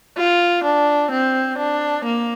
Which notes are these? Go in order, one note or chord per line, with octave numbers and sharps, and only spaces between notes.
F4
D4
C4
D4
A#3